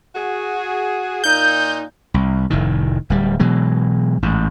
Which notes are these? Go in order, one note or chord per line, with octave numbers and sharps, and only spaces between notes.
F#4 G#4
A#2 D#4 G6
C2
F1 A2 D#3
D1 G3
B2 E3 F#3 G#3
A1 G#2